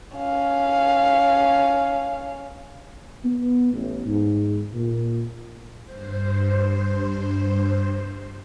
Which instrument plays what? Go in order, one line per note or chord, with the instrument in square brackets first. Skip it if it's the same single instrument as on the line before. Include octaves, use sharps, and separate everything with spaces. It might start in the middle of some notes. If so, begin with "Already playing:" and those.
[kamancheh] C#4 F5
[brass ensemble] B3
A1
G#2
A#2
[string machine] G2 C5